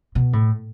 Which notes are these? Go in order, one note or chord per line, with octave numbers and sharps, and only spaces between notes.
B2
A2